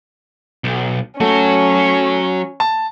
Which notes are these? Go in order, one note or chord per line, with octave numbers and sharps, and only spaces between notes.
B1
F#3 A3 C#4 F#4
A5